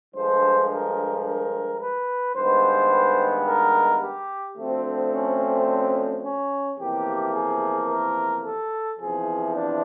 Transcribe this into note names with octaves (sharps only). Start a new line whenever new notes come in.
G2 D3 F3 G#3 C5
A#4
A#4
B4
G2 D#3 G#3 B3 C5
A#4
G4
D2 D3 F3 A3 C4
C#4
C#4
C#4
E2 C3 F3 A#3 G4
G#4
A#4
A4
E2 C3 F3 G#4
D4